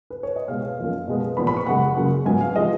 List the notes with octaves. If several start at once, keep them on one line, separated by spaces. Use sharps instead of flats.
B4
C#5
D#5
B2 G#3 B3 F5
F5
F#2 F3 A#3
B2 G#3 B3
A#2 F3 B3 B5
B5
C#6
F#2 C#3 G#3 F#5
C#3 F#3 A#3
G#2 F#3 B3 G#5
F5
F3 G#3 B3 D#5